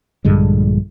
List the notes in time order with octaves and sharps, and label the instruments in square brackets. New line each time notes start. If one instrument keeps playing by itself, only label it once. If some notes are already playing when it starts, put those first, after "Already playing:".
[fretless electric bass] A#1 G2 D3 G#3